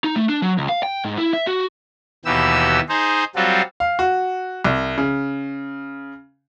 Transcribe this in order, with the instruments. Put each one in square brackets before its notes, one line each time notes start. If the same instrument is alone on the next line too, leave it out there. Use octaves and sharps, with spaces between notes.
[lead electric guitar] D#4
A3
D4
F#3
C#2
F5
G5
G#2
E4
E5
F#4
[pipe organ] D#2 B2 E3 B3 G4 E6
D#4 G#4 C5
F#3 G3 C4 F4 F#4 A4
[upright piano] F5
F#4
C2
C#3